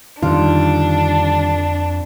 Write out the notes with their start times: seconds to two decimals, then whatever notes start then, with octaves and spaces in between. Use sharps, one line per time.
0.22 F2 D3 D#3 G3 D4 F4